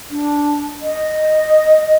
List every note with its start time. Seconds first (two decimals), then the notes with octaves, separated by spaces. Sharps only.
0.10 D4
0.81 D#5